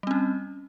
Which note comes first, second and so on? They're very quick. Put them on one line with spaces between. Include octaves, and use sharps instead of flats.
G3 C4 C#4